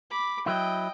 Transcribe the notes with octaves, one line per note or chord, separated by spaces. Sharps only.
B5 D6
F#3 E4 D#5 G5